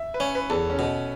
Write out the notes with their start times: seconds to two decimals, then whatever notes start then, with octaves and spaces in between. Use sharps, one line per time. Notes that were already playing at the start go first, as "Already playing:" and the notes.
Already playing: E5
0.14 B4
0.20 C#4 C#5
0.35 B4
0.50 E2 A4
0.70 C#4
0.79 B2